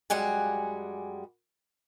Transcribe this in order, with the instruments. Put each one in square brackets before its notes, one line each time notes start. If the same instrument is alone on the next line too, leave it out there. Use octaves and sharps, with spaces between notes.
[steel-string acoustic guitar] F#2 G3 G#3 F#5 G#5